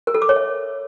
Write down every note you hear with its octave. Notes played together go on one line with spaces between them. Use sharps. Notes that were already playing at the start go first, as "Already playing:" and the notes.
A#4
A4
D6
C#5
E5